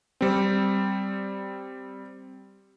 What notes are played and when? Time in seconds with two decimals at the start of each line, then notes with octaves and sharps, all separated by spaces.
0.21 G3 C4